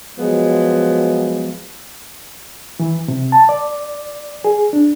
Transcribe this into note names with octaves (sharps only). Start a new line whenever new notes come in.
F3 F#3 G#3 B3
E3
C3
A5
D5
G#4
D4